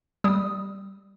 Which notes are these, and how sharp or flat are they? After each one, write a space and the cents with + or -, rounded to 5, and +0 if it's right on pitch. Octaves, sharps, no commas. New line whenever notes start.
G3 +0 D#6 +0